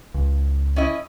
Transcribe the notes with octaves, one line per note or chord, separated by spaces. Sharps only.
C#2
C#4 E4 D#5